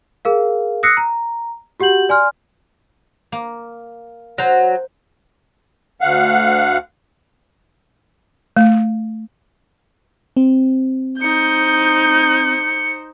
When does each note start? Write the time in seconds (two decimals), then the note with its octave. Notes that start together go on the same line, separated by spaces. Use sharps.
0.25 G#4 A#4 F5
0.83 D#6 E6 F#6 A#6 C7 C#7
0.97 A#5
1.80 F#4 G4 F#5 G6 F#7
2.09 D5 G#5 C6 F6
3.32 A#3
4.38 F#3 C5 A#5
6.01 D2 F5 F#5
8.57 A3
10.37 C4
11.21 D#4 C5 G6 C#7